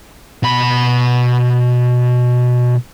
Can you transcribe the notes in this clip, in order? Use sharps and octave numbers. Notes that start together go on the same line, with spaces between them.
B2 B5